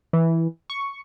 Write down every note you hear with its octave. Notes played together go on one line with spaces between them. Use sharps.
E3
C#6